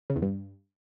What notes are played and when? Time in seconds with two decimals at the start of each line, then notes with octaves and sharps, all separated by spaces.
0.10 C#3
0.16 E2
0.22 G2